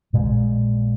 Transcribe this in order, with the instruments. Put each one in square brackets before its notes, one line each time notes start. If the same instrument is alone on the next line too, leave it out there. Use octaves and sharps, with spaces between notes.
[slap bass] A#1 A#2 G#3